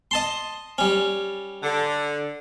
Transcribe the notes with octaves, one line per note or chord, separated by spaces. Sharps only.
D#5 A5 C6
G3 C#4
D3